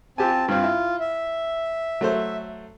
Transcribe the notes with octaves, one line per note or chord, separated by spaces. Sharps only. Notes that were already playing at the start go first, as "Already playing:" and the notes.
C4 F4 G4 G#5 A5
G2 C4 F4
E4
E5
F#3 A3 C5